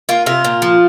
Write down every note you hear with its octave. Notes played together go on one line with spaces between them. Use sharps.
A#3 F4
C3 F4
A#2
F3